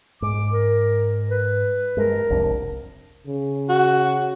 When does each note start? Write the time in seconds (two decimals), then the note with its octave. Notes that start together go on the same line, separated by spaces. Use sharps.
0.22 G#2 D6
0.52 A#4
1.30 B4
1.97 G2 G#3 A#4
2.30 F1 C2 D4
3.27 C#3
3.69 F#4